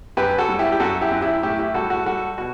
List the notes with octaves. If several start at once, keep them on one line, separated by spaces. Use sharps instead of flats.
F#2 G4 B4
F#4 A4
G3
E4 G4
G4
F#2 F#4 A4
E4 G4
F#2
E4 G4
A2 E4 G4
E4 G4
G3 F#4 A4
F#4 A4
G3 F#4 A4
B2 F#4